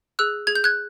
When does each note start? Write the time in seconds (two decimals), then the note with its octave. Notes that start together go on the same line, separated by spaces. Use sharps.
0.19 G#4 E6 F#6
0.47 G#4 G#6
0.55 G6
0.64 F#6 G#6